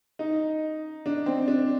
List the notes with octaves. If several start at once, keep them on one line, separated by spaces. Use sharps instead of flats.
D#4
D4
C4
D4